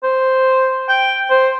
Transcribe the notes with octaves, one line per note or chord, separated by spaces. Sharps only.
C5
G5
C5